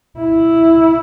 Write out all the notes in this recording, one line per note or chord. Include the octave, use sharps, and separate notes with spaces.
E4